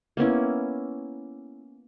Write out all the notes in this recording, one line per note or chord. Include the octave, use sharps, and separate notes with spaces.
A#3 B3 C#4 E4